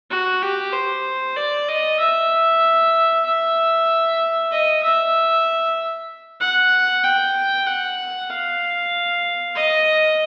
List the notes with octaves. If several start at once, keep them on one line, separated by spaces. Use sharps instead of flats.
F#4
G4
C5
D5
D#5
E5
E5
D#5
E5
F#5
G5
F#5
F5
D#5